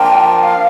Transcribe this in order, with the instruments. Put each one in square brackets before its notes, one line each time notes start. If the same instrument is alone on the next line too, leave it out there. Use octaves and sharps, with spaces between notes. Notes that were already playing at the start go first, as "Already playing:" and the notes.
Already playing: [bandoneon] F3 A#3 D4 F4 A#4 [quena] G5
[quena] F5